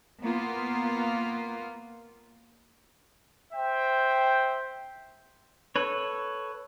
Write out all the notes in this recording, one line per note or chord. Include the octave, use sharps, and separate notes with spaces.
A#3 B3 F4
C5 E5 G5
A4 B4 C#5